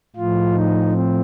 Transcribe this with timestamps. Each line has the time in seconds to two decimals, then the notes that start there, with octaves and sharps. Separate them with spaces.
0.16 A2 F3 F4
0.54 D#4
0.92 C4